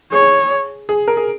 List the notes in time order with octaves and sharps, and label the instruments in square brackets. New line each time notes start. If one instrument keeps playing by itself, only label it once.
[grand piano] G#4 [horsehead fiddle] C#5
[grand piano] G#4
A#4
G#4